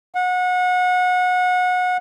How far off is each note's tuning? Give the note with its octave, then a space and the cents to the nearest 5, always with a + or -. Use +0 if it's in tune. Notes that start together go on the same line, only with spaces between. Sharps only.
F#5 -30